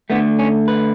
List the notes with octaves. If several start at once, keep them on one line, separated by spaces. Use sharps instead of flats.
D2 D3 A3 B3
C#4
B4